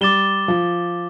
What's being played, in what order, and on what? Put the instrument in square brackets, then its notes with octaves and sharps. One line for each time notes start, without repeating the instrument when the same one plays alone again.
[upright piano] G3 [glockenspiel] D6 A6 E7 G7
[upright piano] F3